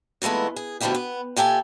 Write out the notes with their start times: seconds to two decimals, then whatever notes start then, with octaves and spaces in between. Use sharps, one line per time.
0.22 A#2 E3 G#3 A3 B3
0.56 G#4
0.81 B2 D3 F3 A3 E4 G4
0.95 B3
1.36 A#2 G4 A4 E5 G#5